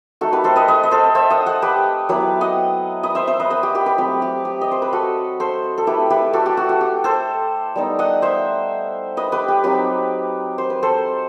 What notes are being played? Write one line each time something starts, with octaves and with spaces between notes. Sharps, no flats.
A3 D#4 F#4 A4
G4 B4
A4 C5
B4 D#5
B4 D#5
D#5
A4 C5
C5 E5
D#5 F#5
D#5 F#5
G4 B4
F#3 B3 E4 G4 B4
D#5 F#5
B4 D#5
C5 E5
C5 E5
B4 D#5
B4 D#5
G4
G4 B4
G4 B4
F#3 A3 C4 G4 B4
G4
G4
D#5
C5
B4
F#4 A4
A4 C5
A4
A3 E4 G4 B4
G4 B4
F#4 A4
G4
F#4
F#4
G4
A4 C5
G3 B3 D#4
D#5 F#5
C5 E5
B4 D#5
G4 B4
G4
F#3 C4 D#4 G4 B4
C5
B4
A4 C5